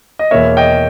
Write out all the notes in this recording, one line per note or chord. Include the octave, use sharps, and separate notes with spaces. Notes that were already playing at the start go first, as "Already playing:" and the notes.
D#5
E2 B2 A#3 C#5 E5
D#5 G5